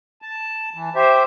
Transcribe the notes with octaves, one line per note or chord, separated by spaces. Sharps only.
A5
E3
G4 C5 E5